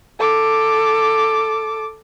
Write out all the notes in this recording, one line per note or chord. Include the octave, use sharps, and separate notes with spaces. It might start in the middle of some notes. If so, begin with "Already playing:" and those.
A4 D6